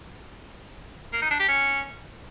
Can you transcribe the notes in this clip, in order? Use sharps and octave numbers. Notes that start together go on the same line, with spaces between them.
A#3
D#4
D4
G4
C#4